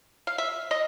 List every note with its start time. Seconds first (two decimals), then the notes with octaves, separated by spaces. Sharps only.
0.27 F5
0.38 E5
0.71 D#5